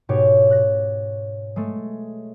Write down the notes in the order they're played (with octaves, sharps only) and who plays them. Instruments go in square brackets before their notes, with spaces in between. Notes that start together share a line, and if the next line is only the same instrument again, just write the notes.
[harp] G#2 B2 G4 C#5
F#6 A#6
G#3 A3